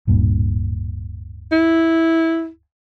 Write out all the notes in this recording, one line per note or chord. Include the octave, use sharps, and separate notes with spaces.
D1 G2 A#2
E4